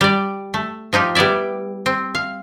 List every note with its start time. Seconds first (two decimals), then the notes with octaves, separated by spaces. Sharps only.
0.01 G3 D5
0.54 A3
0.93 F3 D#4 F4 G4
1.15 G3 B3 E4 D5 E5
1.86 C4
2.15 F5